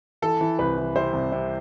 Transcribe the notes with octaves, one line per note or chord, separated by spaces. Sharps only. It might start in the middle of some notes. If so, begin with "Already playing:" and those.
E3 A4
E3
C2 B4
E3
C3 C5
C2
C3